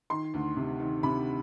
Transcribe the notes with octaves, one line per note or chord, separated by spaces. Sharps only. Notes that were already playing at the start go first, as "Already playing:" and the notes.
D#3 C6
D2
C3
D#3
C3 B5